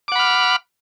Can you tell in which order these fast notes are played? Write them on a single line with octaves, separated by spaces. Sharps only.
D6 F#5 B5 F6